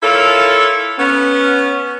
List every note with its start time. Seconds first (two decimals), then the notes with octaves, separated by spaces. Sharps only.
0.02 E4 F4 A4 A#4 C#5
0.98 B3 C#4